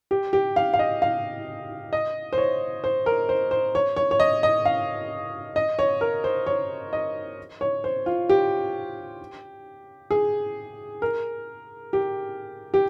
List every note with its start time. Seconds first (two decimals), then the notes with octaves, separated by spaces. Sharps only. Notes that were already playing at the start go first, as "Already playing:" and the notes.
0.11 G4
0.33 G4
0.56 F5
0.74 F5
0.79 D#5
1.02 F5
1.93 D#5
2.33 C5
2.38 C#5
2.84 C5
3.06 A#4
3.29 C5
3.51 C5
3.75 C#5
3.96 C#5
4.11 C#5
4.20 D#5
4.43 D#5
4.65 F5
5.56 D#5
5.79 C#5
6.01 A#4
6.24 C5
6.46 C#5
6.93 D#5
7.61 C#5
7.84 C5
8.06 F4
8.29 G4
10.11 G#4
11.02 A#4
11.93 G4
12.74 G4